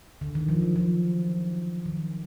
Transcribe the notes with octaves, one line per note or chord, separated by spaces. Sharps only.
D3
D#3
F3
F#3
F3
D#3